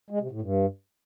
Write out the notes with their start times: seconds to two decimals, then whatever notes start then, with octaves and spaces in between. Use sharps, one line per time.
0.10 G#3
0.21 C3
0.31 A2
0.41 G2